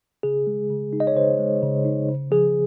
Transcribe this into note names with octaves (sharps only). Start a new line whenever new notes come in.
C#3 G#4
G#3
C#3
D#4
D#5
C#5
C#3 C5
G#3
C#3
D#4
C#3
F3 G#4